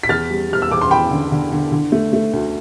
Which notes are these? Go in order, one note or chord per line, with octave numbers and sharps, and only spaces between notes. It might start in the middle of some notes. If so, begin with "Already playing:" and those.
B6
E2 F6 A6
G3
G3 F6
E6
E2 D6
C6
E2 G5 B5
D3
D3
D3
D3
A3
A3
D2